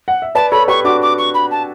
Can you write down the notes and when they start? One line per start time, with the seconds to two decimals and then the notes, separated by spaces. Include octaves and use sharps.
0.08 F#5
0.22 E5
0.35 B4 D5 A5
0.51 A4 C#5 B5
0.68 G4 B4 C#6
0.85 D4 F#4 D6
1.01 D6
1.18 C#6
1.34 B5
1.51 A5